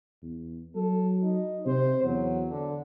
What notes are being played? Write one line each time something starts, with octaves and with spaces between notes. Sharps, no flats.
E2
F#3 A4
D#4
C3 C5
E2 F#3
D3